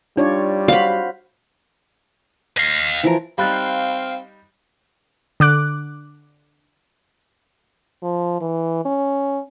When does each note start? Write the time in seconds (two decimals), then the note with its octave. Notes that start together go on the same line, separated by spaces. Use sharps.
0.17 G3 D4 D#4 F4 C#5 D5
0.68 F#4 C5 F5 B5
2.58 D#5 F5
3.04 E3 F3 A#4
3.38 G3 C4 D#4 F5 B5 F#6 A6
5.40 D3 D6 F#6
8.03 F3
8.41 E3
8.85 C#4